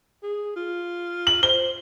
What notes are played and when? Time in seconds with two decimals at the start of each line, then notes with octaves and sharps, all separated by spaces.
0.23 G#4
0.56 F4
1.27 F#7
1.43 C5 G7